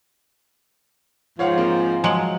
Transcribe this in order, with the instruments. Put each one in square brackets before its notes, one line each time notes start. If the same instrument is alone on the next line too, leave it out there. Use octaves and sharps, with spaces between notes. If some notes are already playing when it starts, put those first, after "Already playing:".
[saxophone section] G#2 F3 [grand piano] C#5 F5 F#5
[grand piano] A#3 C4
[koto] F3 F#3 G#3 [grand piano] C6 F#7